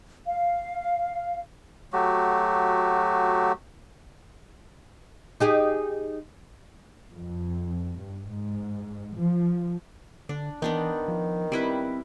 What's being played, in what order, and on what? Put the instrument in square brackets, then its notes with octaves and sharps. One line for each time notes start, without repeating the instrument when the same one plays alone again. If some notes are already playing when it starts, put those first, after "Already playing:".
[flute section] F5
[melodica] F#3 A3 F#4 G4
[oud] D#4 G4 G#4
[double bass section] F2
G2
G#2
F3
[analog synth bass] D3 [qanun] D4
[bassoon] D#3 [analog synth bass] E3 [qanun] B3 D4 D#4
[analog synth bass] F3
[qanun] G3 E4 B4 [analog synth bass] C4